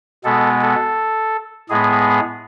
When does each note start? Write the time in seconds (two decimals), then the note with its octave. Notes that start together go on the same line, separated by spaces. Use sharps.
0.24 B2 G#3 B3 A4
0.61 A4
1.70 A2 G#3 B3 G#4